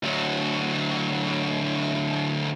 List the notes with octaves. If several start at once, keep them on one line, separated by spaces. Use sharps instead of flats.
D2 F#3